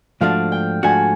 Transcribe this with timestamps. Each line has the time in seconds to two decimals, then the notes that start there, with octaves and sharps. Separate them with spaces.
0.21 G#2 F3 A3 D4 F#4 F5
0.52 G5
0.83 G#2 F3 A3 D4 F#4 G#5